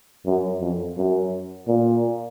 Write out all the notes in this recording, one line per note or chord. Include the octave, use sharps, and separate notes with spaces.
F#2
F2
F#2
A#2